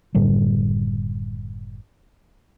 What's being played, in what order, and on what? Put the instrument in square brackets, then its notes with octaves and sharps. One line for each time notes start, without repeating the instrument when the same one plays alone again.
[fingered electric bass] F#1 A2 D3 G3